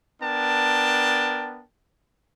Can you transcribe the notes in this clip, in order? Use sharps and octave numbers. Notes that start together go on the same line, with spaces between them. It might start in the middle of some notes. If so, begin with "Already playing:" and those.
B3 D4 A#4 G5 A5